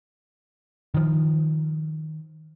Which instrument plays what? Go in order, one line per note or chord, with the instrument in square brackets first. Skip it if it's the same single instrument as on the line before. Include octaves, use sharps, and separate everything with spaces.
[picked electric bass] D#3 F3